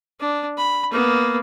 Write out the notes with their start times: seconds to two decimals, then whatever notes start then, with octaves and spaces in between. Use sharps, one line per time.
0.20 D4
0.57 B5
0.91 A#3 B3